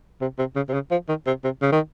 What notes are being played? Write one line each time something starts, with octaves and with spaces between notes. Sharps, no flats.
C3
C3
C#3
C3
C#3
F3
D#3
C3
C3
C#3
D#3